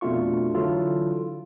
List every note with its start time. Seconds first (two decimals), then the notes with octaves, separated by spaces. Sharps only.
0.01 F2 B2 A3 D4 F4 C#6
0.54 D3 E3 F#3 E4 F4 A4